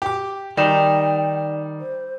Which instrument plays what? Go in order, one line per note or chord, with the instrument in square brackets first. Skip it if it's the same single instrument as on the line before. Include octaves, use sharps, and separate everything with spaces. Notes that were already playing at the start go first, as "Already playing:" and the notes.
[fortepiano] G4 D6
[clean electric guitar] D#3 D#4 [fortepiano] G3 [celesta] D5 E7 [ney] G5
[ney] C5